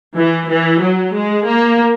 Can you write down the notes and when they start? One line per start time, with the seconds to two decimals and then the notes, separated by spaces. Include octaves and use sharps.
0.17 E3
0.49 E3
0.82 F#3
1.15 G#3
1.47 A#3